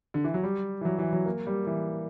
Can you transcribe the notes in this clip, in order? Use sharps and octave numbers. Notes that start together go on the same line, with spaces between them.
D3
E3
F#3
G3
E3
F#3
E3
F#3
A#3
G3
E3